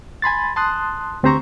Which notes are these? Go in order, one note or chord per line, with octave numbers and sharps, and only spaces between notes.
G#5 B5 C6 A6
A5 C6 D#6 F#6
D2 C4 G4 C5 A#5 C#6